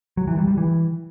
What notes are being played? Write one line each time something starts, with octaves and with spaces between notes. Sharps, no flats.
F#3
E3
G3
G3
E3